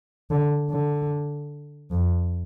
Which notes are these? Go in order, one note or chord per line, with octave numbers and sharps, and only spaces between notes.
D3
D3
F2